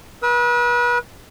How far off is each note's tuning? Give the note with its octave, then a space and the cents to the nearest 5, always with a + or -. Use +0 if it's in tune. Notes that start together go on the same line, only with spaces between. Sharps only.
B4 -35 E6 -40